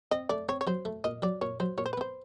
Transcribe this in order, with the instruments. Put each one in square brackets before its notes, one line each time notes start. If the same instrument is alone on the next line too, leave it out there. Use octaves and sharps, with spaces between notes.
[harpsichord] C4 [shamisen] D#5
[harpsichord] A3 [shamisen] D5
[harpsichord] C4 [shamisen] C#5
[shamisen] C#5
[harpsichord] F#3 [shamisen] C5
[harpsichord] A3
[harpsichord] A#2 [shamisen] D#5
[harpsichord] F#3 [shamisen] D5
[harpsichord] A#2 [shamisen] C#5
[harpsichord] F#3 [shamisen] C5
[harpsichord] A#2 [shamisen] C#5
[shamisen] C5
B4
[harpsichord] B3 [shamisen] C5